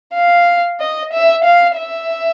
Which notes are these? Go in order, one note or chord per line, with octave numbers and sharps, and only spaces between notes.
F5
D#5
E5
F5
E5